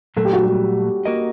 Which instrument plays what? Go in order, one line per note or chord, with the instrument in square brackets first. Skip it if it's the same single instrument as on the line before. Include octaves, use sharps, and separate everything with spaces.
[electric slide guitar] A#2 F#3 A3 [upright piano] A4
[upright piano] G4
F#4
G3 G4
[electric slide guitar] A#3 F#4 A#4 D#5